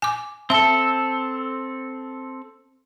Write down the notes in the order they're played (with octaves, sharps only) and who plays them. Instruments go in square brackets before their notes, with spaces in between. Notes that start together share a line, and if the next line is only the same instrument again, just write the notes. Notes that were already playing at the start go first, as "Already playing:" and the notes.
[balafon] G#5 D6
[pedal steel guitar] C4 A4 [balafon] E5 A5